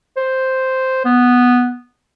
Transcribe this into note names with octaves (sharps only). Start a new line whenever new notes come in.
C5
B3